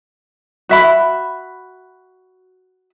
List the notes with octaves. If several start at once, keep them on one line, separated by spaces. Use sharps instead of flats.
F#4 E5 B5